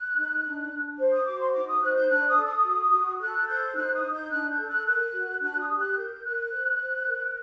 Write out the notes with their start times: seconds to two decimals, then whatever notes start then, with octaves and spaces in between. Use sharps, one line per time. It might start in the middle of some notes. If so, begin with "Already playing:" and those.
Already playing: F#6
0.15 D#4
0.44 D4
0.71 D4
0.98 C5
1.11 D#6
1.26 F#4 D6
1.39 C6
1.53 D#4 D6
1.68 D#6
1.81 C5 F#6
1.96 G6
2.09 D4 F#6
2.28 D#6
2.36 A4
2.45 D#6
2.64 F#4
2.91 F#4
3.20 A4 F#6
3.47 C5 G6
3.74 D#4 F#6
3.94 D#6
4.03 D#4
4.12 G6
4.30 D4 F#6
4.49 G6
4.57 A4
4.67 F#6
4.86 A#4 F#6
5.13 F#4
5.40 D4 F#6
5.59 D#6
5.69 G4
5.78 F#6
5.95 A#4 G6
6.23 A#4 F#6
6.51 C5
6.79 C5
7.07 A#4